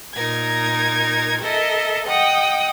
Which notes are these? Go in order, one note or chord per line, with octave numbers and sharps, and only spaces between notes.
A#2 D#4 A#4 G#6
A4 A#4 D#5 E5
D#5 F#5 G5 D#6